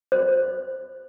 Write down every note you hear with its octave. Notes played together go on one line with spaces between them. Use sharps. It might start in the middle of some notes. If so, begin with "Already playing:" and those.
C5